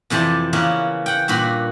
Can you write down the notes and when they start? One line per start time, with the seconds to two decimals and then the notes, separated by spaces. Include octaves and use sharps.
0.10 F2 C3 E3 D5 A5
0.53 C#3 E3 A#3 B3 C#4
1.06 F#5 G5
1.28 G2 A#2 F#4 B5